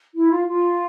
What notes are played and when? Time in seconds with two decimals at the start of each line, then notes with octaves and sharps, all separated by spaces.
0.15 E4
0.30 F4
0.46 F4